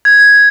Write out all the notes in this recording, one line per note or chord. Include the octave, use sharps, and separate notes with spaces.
G#6